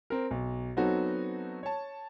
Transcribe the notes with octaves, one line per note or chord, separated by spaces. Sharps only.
C4 A#4
B1
F#3 B3 C4 D#4 F#4 A4
C#5 A5